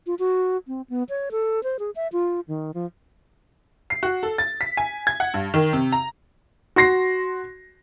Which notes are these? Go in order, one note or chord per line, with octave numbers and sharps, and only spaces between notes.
F4
F#4
C4
B3
C#5
A4
C5
G#4
E5
F4
D#3
F3
C7
F#4
A4
A6
B6
G#5
G#6
F#5
G2
D#3
C3
A#5
F#4 C6 A#6 C7